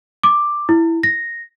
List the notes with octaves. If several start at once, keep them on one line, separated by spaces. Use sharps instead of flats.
D6
E4
A#6